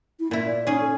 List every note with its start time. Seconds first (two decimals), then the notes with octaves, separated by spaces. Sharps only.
0.20 E4
0.31 A#2 A#3 E4
0.46 D5
0.67 C#4 D#4 G#4
0.81 A4